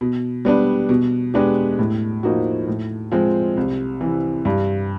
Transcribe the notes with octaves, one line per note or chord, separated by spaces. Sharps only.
B2
G3 B3 D4
B2
G#3 B3 D4 G4
A2
F3 A#3 D#4 F#4
A2
F3 G#3 C4
C2
C3 E3
G2